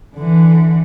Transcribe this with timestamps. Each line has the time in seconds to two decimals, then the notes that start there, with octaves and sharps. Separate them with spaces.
0.16 D3 E3